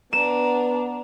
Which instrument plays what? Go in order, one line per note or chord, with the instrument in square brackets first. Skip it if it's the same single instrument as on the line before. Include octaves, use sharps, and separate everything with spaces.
[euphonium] B3 [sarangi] D4 [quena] A#5 [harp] E7